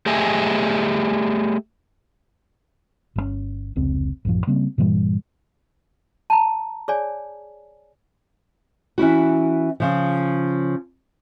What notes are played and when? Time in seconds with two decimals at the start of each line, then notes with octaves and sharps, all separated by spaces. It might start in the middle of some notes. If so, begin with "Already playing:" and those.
0.06 A3 G4 G#4 D#5 E5 G#5
3.16 G1 C#3 C#4
3.76 F1 C#2 C4
4.25 A1 F#2 F3
4.47 C#3 G3 A#3 C4
4.78 G2 A#2 E3 G3
6.30 A5 A#5
6.88 G#4 C#5 D5 G#5
8.98 E3 C#4 E4 F#4
9.80 C#3 F3